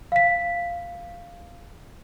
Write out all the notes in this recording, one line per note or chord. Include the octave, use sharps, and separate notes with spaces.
F5 B6